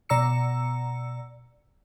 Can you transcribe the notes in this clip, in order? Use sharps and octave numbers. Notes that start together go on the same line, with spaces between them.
B2 D5 A#5 E6 C#7